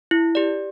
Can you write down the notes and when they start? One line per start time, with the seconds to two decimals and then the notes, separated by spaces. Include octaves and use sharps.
0.11 E4
0.35 G4 D5